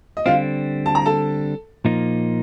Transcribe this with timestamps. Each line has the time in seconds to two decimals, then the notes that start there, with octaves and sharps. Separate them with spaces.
0.17 D#5
0.26 D3 G3 C4 F4 F5
0.86 A5
0.95 A#5
1.06 A4 A5
1.85 A#2 F3 A#3 D#4